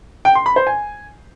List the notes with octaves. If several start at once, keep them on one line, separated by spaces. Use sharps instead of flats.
G5
C6
B5
C5
G#5